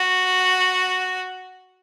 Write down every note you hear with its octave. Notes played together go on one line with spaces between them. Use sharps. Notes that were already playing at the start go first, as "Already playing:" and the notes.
Already playing: F#4